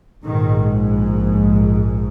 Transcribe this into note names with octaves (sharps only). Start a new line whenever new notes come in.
A#1 G#2 D#3